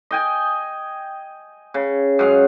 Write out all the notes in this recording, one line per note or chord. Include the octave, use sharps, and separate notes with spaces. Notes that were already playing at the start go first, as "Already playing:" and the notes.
D#5 G5 G#5
C#3
F#2 G#3 F5